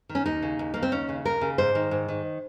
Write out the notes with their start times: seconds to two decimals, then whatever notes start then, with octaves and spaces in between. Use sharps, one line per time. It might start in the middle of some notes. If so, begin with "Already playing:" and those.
0.09 D#3
0.15 C#4
0.26 D#2 D#4
0.42 C#3
0.59 D#2
0.74 C#3 A#3
0.83 C4
0.92 D#2 C#4
1.09 C#3
1.25 D#2 A#4
1.41 C#3
1.58 G#2 C5
1.75 D#3
1.91 G#2
2.08 D#3